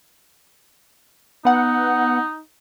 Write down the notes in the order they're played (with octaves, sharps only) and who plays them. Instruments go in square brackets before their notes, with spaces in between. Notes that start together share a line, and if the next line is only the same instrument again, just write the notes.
[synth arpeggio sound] B3 F#5 [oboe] D#4